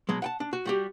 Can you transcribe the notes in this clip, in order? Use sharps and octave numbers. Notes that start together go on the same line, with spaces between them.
B2 F#3 G#3
F#5 G5 A5
D4
F#4
G3 F#4 G4